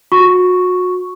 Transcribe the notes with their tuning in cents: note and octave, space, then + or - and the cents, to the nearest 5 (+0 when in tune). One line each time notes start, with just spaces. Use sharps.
F#4 -30 C#6 +0